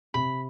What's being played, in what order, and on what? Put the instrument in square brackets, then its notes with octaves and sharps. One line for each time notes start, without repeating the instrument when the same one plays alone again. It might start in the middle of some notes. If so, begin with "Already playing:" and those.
[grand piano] C3 [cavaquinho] B5